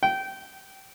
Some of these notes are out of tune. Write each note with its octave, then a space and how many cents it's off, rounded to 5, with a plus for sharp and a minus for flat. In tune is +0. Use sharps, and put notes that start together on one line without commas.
G5 -20